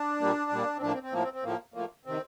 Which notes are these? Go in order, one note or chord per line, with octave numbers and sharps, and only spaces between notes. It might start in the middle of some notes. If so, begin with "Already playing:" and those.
Already playing: D4
A#2 G3 A#3
A#2 G3 A#3
C4
A2 F3 A#3 D4
C4
C4
A2 F3 A#3
C4
C4
A2 F3 A#3
A2 F3 A#3
C3 D#3 C4